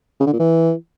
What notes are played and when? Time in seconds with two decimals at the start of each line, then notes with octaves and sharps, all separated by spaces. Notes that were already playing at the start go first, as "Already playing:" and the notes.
0.20 C#3
0.27 D3
0.33 A#2
0.40 E3